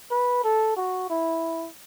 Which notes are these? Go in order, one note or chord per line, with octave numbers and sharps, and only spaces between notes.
B4
A4
F#4
E4